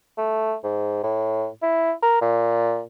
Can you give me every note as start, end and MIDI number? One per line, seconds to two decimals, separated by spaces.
0.17 0.55 57
0.64 1.00 44
1.03 1.47 45
1.62 1.92 64
2.02 2.19 70
2.21 2.82 46